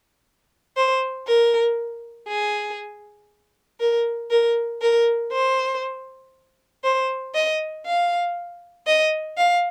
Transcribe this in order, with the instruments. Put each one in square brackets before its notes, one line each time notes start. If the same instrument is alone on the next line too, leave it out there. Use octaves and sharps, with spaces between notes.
[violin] C5
A#4
G#4
A#4
A#4
A#4
C5
C5
D#5
F5
D#5
F5